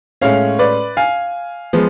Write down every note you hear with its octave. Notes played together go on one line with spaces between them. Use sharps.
A2 G#3 C#4 C#5 F5
B4 D5
F5 G#5
F3 G#3 B3